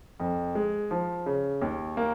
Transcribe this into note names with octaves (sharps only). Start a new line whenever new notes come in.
F2
G#3
F3
C#3
D#2
A#3